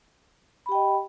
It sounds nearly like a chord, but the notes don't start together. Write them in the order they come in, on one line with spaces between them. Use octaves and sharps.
B5 G4 G5 D#5